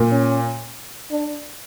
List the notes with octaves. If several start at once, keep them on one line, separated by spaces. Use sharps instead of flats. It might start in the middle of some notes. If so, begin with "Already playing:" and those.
Already playing: A#2
C#4
D4